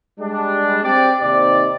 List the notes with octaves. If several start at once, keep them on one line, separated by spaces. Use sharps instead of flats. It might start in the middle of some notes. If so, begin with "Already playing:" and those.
G3 G#3 D4
C4 G4 D5
D#2 C3 D#4 D5